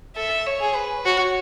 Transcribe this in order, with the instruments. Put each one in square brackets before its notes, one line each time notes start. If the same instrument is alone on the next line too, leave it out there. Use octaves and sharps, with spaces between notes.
[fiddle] A4 [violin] E5
[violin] C#5
[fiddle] G#4
[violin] B4
[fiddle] F#4 [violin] C#5